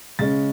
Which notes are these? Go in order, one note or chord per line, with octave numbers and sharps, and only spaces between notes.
C#3 G#3 C#4 A6